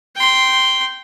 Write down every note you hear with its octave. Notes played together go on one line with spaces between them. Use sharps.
G5 C6